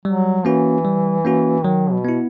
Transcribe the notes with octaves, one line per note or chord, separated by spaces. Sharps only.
F#3 G3
E3 A#3 C#4 F#4
G3
A#3 C#4 F#4
D#3 F#3
B2
B3 E4